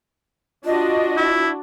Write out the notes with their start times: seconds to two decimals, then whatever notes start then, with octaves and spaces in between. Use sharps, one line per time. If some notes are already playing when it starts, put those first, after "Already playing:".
0.65 D4 F4 F#4 D#5
1.17 E4